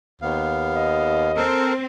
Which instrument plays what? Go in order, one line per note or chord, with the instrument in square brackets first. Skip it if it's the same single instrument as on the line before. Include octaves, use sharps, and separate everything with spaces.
[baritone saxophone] D#2 [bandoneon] B3 F5
[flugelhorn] D#5
[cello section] C4 [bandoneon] A4 A#4